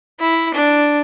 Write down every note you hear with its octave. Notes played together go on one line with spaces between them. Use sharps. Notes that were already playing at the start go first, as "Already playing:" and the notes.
E4
D4